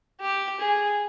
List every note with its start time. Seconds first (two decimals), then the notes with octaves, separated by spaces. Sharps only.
0.21 G4
0.60 G#4